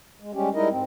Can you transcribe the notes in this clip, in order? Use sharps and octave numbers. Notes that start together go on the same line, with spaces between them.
G#3
G3 G#3 C#4 G4
G3 G#3 D#4 E4 A#4 D#5
G#2 C4